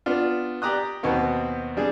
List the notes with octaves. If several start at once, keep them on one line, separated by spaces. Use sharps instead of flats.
B3 D4 F4
G4 D5 A#5 D#6 F#6
D#2 B2 B3 C4
G3 D4 G#4